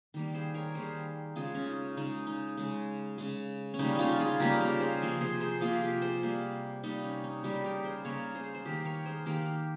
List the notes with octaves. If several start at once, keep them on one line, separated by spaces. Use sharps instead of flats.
D#3 G3 A#3
G#4 C5
A#4 C#5
D#3 G3 A#3 G#4 C5
C#3 G#3 F4 G#4
C#4
D#4
C#3 G#3 D#4
D#4
C#3 G#3
C#3 G#3
C#4
C#3 G3 A#3 D#4
C#4 D#4 F4
F4 G#4
C#3 G3 A#3 G4 A#4
G4 A#4
G#4 C5
C3 F3 A#3
G#4 C5
G#4 C5
C3 F3 A#3 F4 G#4
G4 A#4
G#4 C5
C3 G3 A#3
C3 G3 A#3 D#4
C#4
D#4
C#3 G3 A#3 D#4 G4
G4 A#4
G#4 C5
C#3 G3 A#3 A#4 C#5
G#4 C5
C5
D#3 A#3 G4 A#4
A#4 C#5
G#4 C5
D#3 A#3 G4 A#4